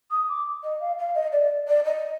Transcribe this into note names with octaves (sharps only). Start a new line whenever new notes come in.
D#6
D6
D#5
F5
F5
D#5
D5
D5
D#5